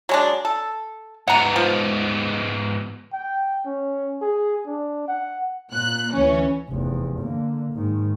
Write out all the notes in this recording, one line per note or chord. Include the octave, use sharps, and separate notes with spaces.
F#3 G#3 D4
A4
G#2 B3 F#5 A#5
F3
G5
C#4
G#4
D4
F#5
A#2 F#6
D2 E3 C#4
F1 E2
D3 A#3
G#2 D#3